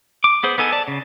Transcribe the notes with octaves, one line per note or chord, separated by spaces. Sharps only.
D6
B3 G#4 C5
B3 D#4 A4 G#5
D5 A5
C#3